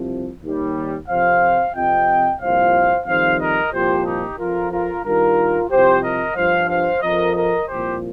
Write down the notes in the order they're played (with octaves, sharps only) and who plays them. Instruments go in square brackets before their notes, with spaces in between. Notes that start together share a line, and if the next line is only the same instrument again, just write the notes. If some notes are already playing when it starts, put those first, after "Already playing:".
Already playing: [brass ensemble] C2 C3 F3
D#2 D#3 G3
F2 C3 F3 C5 F5
F2 C3 F3 D#5 G5
C2 A#2 F3 C5 F5
F2 D#3 G3 C5 F5
A#4 D#5
C2 A#2 F3 G4 C5
D#4 G4
F2 F3 F4 A#4
F4 A#4
G2 D#3 G3 F4 A#4
C2 C3 F3 G4 C5
A#4 D#5
G2 F3 C5 F5
C5 F5
F2 F3 A#4 D#5
A#4 D#5
C2 A#2 F3 G4 C5